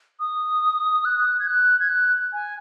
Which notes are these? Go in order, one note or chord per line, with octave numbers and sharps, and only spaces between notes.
D#6
F#6
G#6
F#6
G#6
F#6
G#5